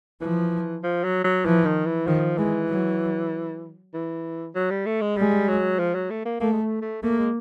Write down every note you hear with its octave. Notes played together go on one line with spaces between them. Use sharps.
E3 F3
F3
F#3
F#3
E3 F3
D#3
E3
D#3 F3
E3 G#3
F#3
E3
F#3
G3
A3
G#3
G3 G#3
F#3
F3
F#3
A3
A#3
A3 A#3
G#3
A3
A3
A3 A#3
G#3